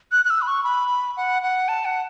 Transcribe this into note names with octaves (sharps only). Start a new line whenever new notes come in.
F#6
F#6
E6
B5
C#6
B5
F#5
F#5
A5
F#5